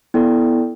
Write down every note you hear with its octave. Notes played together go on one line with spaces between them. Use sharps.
B3 E4 A4 D5 G5